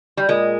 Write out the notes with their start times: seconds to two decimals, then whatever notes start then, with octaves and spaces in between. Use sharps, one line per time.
0.17 G3
0.29 A#2 G#3